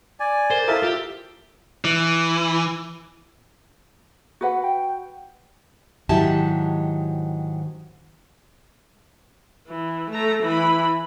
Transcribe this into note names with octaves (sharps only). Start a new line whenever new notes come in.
D5 G#5
A#4 C5
E4 A4 A#4 E5 F5 D#6 A6
F4 G4
E3
F#4 B4 F#5
G5
G#2 D#3 F#3 E4 G4 A5
E3
A3 A#5
E3 B5